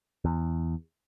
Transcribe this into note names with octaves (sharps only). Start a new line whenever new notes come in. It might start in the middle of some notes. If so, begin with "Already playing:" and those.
E2